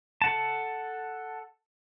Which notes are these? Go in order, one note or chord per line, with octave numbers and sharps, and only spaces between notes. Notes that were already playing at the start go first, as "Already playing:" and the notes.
A4 F#5 A5